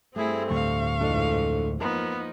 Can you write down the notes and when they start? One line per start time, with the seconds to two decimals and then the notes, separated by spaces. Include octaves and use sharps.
0.16 G2 A3 C4 E4 G#4
0.50 D2 A2 D3 F5 C#6
1.00 F2 G#2 E3 D4 A4 D#5
1.81 F3 A#3 B3 D#4 A#4